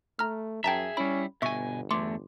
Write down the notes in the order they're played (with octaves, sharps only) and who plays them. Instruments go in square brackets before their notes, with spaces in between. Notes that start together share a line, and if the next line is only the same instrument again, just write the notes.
[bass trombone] A3 [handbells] A#5 F6
[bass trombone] F#2 [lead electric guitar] G#4 E5 [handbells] G5 A5 A#5
[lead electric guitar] G3 E4 [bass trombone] C#4 [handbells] B5
[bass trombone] G1 [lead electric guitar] B2 G#5 [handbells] E5 C#6
[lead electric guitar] E2 A3 [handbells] C6 D6